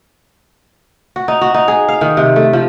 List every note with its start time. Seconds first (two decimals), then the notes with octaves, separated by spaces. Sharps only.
1.16 F#4
1.28 D#4
1.41 F#4
1.54 D#4
1.68 G#4
1.88 F5
2.01 D#3
2.17 C3
2.36 A3
2.53 F3